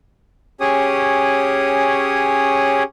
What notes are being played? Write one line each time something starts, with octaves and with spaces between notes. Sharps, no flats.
C#4 G4 G#4 C#5 D#6